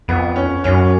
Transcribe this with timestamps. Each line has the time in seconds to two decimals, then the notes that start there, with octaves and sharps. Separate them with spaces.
0.08 F2 B3
0.36 C#4
0.64 F#2 C#4